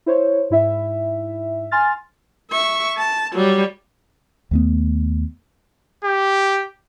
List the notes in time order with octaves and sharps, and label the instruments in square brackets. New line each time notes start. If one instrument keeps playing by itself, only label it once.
[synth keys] E4 C5 C#5
G#2 E4 E5
G#5 C6 F6 A6
[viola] E5 C#6
A5
F#3 G3
[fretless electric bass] D#2 A3 B3
[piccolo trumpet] G4